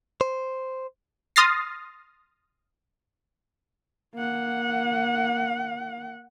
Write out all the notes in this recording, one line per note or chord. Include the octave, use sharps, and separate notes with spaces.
C5
C6 D#6 F6 A6 A#6 C7
A#3 F#5